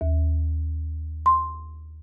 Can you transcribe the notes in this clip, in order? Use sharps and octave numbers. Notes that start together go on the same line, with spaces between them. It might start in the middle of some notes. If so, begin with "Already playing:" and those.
D#2
C6